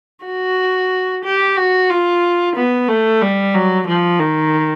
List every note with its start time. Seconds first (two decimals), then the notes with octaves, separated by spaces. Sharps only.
0.25 F#4
1.24 G4
1.57 F#4
1.90 F4
2.56 B3
2.89 A3
3.22 G3
3.54 F#3
3.87 F3
4.20 D#3